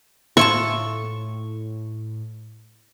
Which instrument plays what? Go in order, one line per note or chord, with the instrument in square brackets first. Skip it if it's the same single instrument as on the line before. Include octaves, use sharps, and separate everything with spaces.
[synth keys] A2 [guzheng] E4 F4 A5 [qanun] C#6